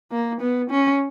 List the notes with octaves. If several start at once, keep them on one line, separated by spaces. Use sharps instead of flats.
A#3
B3
C#4